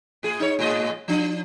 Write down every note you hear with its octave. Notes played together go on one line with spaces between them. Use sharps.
A2 G#4
D#4 C#5
A2 G#3 D#5
F3 D4